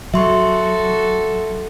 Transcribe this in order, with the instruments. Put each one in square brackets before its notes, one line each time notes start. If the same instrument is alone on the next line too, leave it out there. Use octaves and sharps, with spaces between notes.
[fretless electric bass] F#3 [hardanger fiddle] F#4 A4 [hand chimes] E5 C6 C#6